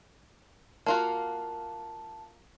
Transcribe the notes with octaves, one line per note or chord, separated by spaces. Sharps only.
A#3 F4 F#4 A5